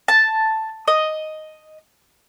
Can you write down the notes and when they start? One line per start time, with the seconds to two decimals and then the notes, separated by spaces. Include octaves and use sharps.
0.08 A5
0.88 D#5